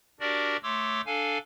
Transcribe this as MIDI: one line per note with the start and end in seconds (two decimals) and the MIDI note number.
0.20 0.57 62
0.20 0.57 66
0.20 0.57 67
0.20 0.57 70
0.20 0.57 74
0.63 1.01 57
0.63 1.01 73
0.63 1.01 84
0.63 1.01 86
0.63 1.01 88
1.06 1.38 62
1.06 1.38 69
1.06 1.38 77
1.06 1.38 80